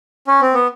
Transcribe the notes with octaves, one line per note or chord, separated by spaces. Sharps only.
C#4
C4
B3